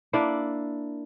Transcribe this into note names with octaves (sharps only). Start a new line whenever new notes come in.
A#3 D4 E4